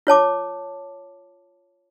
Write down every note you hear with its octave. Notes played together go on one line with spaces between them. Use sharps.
F4 C#5 A5 D6